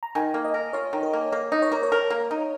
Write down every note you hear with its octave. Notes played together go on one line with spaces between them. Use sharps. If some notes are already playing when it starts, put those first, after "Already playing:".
A#5
D#3 G#5
A#3
D#5
A#4
F4 C#5
D#3
A#4
A#3
A#3 A#4
D#4
C#5
A#3 A#4
C#5
A#4
A#3
D#4